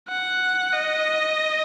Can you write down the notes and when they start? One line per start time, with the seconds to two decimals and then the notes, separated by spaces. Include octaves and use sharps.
0.09 F#5
0.73 D#5